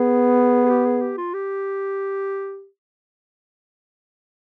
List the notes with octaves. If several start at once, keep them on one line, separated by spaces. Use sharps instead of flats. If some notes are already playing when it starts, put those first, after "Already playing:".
Already playing: B3 G#4
G#4
G4
G#4
G4
F4
G4